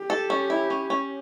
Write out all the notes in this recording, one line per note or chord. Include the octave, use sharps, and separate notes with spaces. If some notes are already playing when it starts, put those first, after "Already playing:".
Already playing: G4
A4
C#4
E4
C#4
C#4